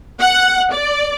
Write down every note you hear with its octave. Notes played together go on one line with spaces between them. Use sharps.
F#5
D5